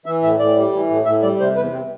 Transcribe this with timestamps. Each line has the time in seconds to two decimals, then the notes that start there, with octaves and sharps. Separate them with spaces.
0.06 E3 E5
0.22 A2 E5
0.39 A2 D5
0.56 G3
0.73 E3
0.89 A2
1.06 A2 E5
1.23 G3 D5
1.40 C3 C5
1.56 E2 B4
1.73 C4